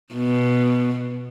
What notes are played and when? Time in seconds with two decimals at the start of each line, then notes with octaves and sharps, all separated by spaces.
0.14 B2